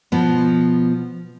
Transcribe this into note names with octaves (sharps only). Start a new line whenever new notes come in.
B2 F3 B3